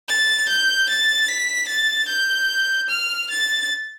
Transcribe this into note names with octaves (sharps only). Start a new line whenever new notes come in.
A6
G6
A6
B6
A6
G6
F6
A6